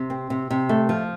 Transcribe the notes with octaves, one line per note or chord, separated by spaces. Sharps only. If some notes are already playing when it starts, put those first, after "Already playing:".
Already playing: C3
C4
C3
C3
A3
F3